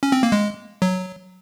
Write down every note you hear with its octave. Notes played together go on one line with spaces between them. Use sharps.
C#4
C4
A#3
G#3
F#3